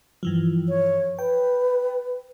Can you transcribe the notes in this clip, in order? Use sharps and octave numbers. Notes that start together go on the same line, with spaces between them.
G2 E3 F3
C#5
B4 G5